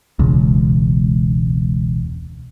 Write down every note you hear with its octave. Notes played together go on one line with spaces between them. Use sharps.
E1 C#2